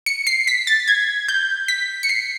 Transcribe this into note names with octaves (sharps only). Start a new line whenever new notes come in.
C#7
C7
B6
A6
G#6
G6
B6
C#7
C7